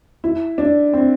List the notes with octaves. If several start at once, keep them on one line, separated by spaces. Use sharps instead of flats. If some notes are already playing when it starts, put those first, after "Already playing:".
E4
D4
C4